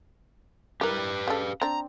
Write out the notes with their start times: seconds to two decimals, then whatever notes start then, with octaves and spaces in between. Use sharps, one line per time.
0.81 E4 G4 A#4 B4
1.28 C#3 A4
1.62 C4 D4 A#5